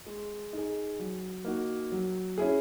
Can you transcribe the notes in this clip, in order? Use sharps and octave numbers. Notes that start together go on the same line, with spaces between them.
G#3
D#4 G#4
F#3
A#3 D#4 F#4
F#3
C#4 E4 G#4